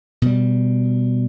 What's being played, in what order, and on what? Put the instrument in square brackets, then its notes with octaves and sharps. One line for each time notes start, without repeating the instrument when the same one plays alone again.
[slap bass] B2 G3